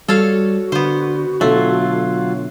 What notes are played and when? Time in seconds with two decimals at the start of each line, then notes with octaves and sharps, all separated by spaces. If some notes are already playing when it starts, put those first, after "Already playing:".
0.08 G3 F#4 A4 C#5 F5
0.72 D3 B3 C5
1.41 B2 D3 F#3 A3 F4